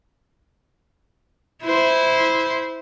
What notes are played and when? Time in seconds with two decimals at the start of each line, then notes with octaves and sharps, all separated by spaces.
1.63 E4 C5